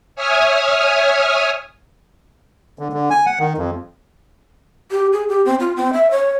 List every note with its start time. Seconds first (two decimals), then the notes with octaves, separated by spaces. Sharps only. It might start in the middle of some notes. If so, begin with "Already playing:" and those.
0.15 C#5 E5 G#5 D#6 F6
2.79 D3
2.93 D3
3.10 G#5
3.26 F#5
3.39 D#3
3.58 F2
4.91 G4
5.13 G#4
5.29 G4
5.46 C4
5.60 F4
5.76 C4
5.93 E5
6.11 C#5